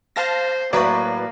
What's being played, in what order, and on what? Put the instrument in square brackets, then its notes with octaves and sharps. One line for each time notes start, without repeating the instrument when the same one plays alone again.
[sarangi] C5 [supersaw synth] F5 A5 A#6
[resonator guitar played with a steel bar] A2 F#3 [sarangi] A#3 [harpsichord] F#4 C#5 [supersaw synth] B4 D5